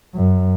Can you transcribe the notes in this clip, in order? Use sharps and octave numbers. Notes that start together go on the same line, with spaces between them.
F#2